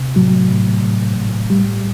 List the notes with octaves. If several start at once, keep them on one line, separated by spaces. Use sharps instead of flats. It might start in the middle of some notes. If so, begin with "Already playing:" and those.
Already playing: C3
A2 F#3
A2
A2
A2
A2 G3